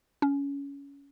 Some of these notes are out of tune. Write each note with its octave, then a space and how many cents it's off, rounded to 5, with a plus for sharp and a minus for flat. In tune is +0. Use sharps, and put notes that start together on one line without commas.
C#4 +20